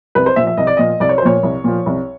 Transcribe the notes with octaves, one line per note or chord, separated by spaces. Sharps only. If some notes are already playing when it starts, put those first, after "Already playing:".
C2 B4
C5
A#2 F3 E5
E5
C2 D#5
D5
A#2 F3 D#5
C2 D5
C#5
C5
A#2 F3 C#5
C2
A#2 F3
C2